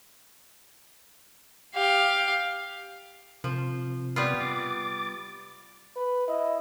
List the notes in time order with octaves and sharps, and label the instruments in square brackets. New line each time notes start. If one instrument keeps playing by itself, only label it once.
[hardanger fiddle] G4 F5
[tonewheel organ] C3 [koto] F3
[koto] G3 B3 F4
[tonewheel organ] D6 A6
[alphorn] B4
[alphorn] E4 [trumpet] D#5